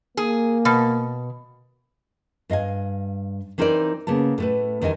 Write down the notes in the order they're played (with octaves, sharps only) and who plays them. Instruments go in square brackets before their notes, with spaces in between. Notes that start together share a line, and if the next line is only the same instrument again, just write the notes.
[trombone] A#3 [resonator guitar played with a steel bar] G#4
[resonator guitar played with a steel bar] B2
[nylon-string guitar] G2 D#5 F5 G#5
E3 C4 D#4 A#4 C5 D5
C#3 A#3 B3 A5
A2 A3 B4
E2 D#3 G3 D#5 G5 G#5